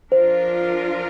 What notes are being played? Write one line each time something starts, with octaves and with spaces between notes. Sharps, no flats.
F3 D4 F4 A#4 C5